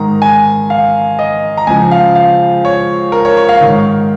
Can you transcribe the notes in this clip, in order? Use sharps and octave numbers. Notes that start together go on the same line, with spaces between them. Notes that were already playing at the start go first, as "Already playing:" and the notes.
Already playing: G#2 D#3 A#5
G#5
F5
D#5
A#5
C#2 C#3 F3 G#5
F5
F5
C#5
A#4
C#5
C#5
F5
D#3
G#2